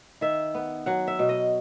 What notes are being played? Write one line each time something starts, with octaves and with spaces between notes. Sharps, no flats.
D#3 E5
B3
F#3 F#5
E5
B2
D#5